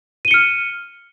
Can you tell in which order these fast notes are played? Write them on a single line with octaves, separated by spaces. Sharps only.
D#7 G7 C#7 F6